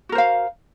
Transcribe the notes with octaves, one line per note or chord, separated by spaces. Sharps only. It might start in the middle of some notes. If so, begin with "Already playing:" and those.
F#4 A#4 C5 F5